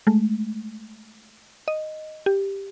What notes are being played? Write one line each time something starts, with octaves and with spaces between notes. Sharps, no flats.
G#3 A3
D#5
G4